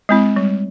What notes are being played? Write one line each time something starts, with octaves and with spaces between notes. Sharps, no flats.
G#3 C4 E4
G3